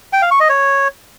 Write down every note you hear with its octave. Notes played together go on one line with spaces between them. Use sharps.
G5
F5
C#6
D#5
C#5